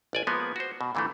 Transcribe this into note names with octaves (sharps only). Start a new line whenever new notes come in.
A1 D5 G#5
F3 G#3 A#3 B3
F#4 C5
B2
A#2 D3 E3 G#3 A3